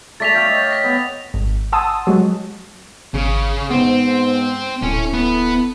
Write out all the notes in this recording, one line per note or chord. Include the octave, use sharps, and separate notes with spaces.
A3 D5 G#5 A6 B6 F7
C#5 F5 G5
D#5
A#6 B6
B3
G#1
F#5 G#5 A5 C6 D#6 E6
F#3 G#3 F#4
G#1 C#3
G#2 B3 C4
D1 C#4 E4 A4
B3